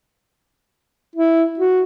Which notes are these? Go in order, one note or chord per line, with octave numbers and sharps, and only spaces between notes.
E4
F#4